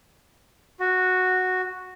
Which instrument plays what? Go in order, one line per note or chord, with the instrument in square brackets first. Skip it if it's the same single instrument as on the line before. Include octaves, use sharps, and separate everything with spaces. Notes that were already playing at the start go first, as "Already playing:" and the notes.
[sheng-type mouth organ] F#4